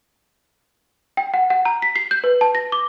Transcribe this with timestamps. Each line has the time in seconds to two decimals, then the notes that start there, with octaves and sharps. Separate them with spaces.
1.17 G5
1.34 F#5
1.50 F#5
1.65 A#5
1.82 B6
1.96 C7
2.11 G6
2.24 B4
2.41 A5
2.55 A#6
2.72 D6